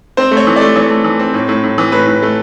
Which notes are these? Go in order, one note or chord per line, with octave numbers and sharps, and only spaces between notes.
C4 C5
A3
C#5
E3
A3 D5
E3 C#5
A3
E3
C4
A2
A2
A2
E3
A2 B4
A2
A3